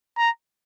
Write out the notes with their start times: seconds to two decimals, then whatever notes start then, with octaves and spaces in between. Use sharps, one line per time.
0.18 A#5